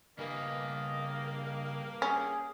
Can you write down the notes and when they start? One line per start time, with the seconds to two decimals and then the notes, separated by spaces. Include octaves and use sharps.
0.18 G2 C#3 A#3 B4 D#5 G#5
2.02 C#4 G#4